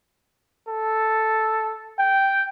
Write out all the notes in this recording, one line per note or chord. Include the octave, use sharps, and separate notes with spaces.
A4
G5